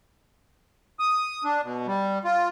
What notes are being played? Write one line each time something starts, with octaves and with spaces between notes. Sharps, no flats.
D#6
D4
B2
G3
F4